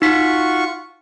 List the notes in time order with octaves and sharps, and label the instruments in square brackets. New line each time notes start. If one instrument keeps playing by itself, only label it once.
[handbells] D#4 B6 [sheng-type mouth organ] F4 F#4 C#6